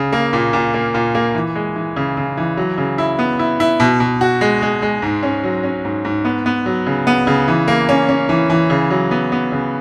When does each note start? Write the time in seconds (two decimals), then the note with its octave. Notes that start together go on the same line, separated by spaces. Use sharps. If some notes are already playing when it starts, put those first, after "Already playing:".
Already playing: C#3
0.13 A#3
0.33 A#2
0.53 A#2
0.74 A#3
0.94 A#2
1.15 A#3
1.35 E3
1.55 G#3
1.76 E3
1.96 C#3
2.17 C#3
2.37 E3
2.57 F#3
2.78 C#3
2.98 E4
3.19 B3
3.39 E4
3.60 E4
3.80 B2
4.00 B2
4.21 F#4
4.41 G#3
4.62 G#3
4.82 G#3
5.02 G#2
5.23 C#4
5.44 F#3
5.64 C#4
5.85 G#2
6.05 G#2
6.25 B3
6.46 B3
6.66 F#3
6.86 C#3
7.07 B3
7.27 C#3
7.48 E3
7.68 A#3
7.89 C#4
8.09 C#4
8.29 E3
8.50 E3
8.70 C#3
8.90 F#3
9.11 B3
9.32 B3
9.52 C#3